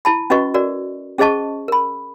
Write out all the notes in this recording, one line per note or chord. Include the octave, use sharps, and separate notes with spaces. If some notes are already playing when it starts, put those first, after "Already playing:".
E4 A5 B5
C#4 F#4 B4 D#5 C#6
F#4 A#4 D5
C#4 G#4 C5 D#5 A5 C#6
A#4 B5